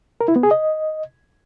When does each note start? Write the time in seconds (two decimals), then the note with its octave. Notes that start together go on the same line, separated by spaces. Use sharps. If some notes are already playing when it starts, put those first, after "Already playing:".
0.21 A#4
0.28 E4
0.36 B3
0.43 G#4
0.51 D#5